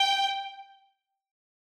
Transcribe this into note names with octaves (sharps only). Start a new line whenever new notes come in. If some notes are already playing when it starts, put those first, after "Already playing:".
Already playing: G5